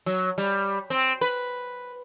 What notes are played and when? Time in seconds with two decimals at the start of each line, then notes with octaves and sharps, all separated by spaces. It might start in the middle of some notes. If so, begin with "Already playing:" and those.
0.06 F#3
0.38 G3
0.90 C4
1.21 B4